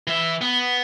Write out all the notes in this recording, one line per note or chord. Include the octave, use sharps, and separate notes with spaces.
E3 E5
B3